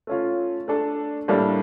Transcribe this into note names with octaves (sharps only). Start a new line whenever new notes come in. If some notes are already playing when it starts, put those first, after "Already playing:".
A3 C#4 F4
A3 D4 A4
A2 G3 A#3 D4 A4